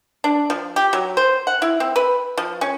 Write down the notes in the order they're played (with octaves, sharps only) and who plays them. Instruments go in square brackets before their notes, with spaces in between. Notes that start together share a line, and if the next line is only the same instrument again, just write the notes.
[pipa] D4
F3
G4
F#3
C5
F#5
E4
C4
B4
F3
C#4